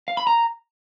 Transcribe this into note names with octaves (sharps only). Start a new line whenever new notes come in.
F5
B5
A#5